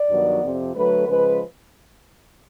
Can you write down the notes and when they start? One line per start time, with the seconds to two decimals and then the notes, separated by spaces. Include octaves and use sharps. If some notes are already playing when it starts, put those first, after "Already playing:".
Already playing: D5
0.10 G2 D#3 F#3 B3
0.42 F2 C3 F3
0.75 D3 F#3 A3 B4
1.07 C#3 F3 G#3 B4